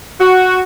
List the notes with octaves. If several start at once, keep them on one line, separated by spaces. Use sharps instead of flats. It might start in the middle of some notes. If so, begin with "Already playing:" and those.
F#4